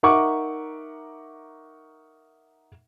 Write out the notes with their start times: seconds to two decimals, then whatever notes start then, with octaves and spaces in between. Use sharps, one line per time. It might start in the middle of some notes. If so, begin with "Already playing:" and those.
0.03 D#4 A#4 E5 F#5 C#6 D6